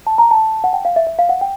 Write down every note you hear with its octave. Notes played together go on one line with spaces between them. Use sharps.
A5
A#5
A5
F#5
G5
F5
E5
E5
F5
F#5
G5